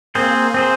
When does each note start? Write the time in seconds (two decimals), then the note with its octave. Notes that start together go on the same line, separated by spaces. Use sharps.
0.15 A#3 C4 G#4 C5
0.54 C4 G#4 C5